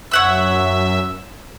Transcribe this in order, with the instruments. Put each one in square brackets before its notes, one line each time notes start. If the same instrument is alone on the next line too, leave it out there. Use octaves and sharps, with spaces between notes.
[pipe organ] F#2 E5 [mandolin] C#5 F#5 E6